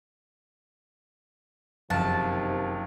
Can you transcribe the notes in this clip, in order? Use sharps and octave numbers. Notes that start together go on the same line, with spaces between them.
F#1 F2 C3 D#3 A5